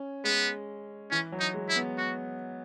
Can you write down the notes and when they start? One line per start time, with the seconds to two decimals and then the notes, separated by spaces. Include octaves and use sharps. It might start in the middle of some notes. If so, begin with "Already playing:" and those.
Already playing: C#4
0.24 G#3 B3
1.11 E3 C#4
1.32 F#3
1.40 D#4
1.54 G#3
1.69 E4
1.76 B3
1.98 F#4